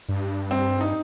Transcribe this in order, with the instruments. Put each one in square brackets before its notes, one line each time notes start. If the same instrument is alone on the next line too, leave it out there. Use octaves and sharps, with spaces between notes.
[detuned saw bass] G2
[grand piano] C4
D#4